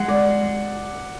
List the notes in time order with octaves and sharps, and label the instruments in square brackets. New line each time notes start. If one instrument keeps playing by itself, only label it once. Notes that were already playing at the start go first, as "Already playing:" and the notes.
Already playing: [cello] G#3 [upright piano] F#5
[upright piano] D5